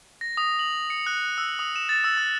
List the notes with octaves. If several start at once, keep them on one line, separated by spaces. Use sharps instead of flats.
A#6
D#6
F#7
C#7
F#6
E6
D#6
E7
A6
E6
F#6